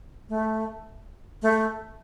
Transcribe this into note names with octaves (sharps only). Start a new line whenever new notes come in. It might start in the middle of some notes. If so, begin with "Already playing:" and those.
A3
A3